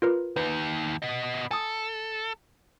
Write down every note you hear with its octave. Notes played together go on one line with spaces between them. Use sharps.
F4 A#4 B4
D#2 D#4 B4
B3 D#5
A4 G#5 D#6